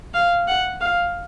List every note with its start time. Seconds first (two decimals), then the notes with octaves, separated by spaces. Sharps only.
0.14 F5
0.47 F#5
0.81 F5